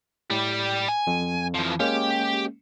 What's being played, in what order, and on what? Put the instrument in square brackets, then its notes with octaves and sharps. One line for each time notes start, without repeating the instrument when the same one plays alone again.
[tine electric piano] A2 [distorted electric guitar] G3 G4
[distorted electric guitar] G#5
[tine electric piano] F2
[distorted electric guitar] E3 F3
[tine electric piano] G#3 A#3 C#4 [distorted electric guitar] G4